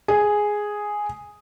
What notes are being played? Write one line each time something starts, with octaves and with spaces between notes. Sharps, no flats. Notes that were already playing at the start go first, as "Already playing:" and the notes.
G#4